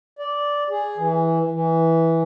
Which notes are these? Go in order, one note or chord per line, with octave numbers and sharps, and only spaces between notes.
D5
G#4
E3
E3